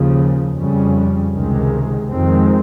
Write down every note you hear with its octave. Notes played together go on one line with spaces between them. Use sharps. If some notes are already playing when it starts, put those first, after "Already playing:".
Already playing: D#2 C#3 F3
F2 C#3 G3 C#4
C#2 C3 D#3 G#3
F2 D#3 G#3 C4